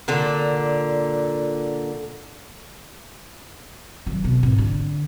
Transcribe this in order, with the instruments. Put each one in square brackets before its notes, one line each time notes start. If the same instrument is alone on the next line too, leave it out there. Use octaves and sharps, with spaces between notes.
[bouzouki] A#2 D3
[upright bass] D#3 F#3
B2
G#1
D3